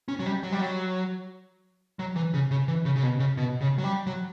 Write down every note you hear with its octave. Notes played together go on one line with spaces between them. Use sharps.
C#4
F#3
G3
F#3
G3
F#3
F#3
E3
C#3
C#3
E3
C#3
C#3
B2
C#3
B2
C#3
F#3
G3
F#3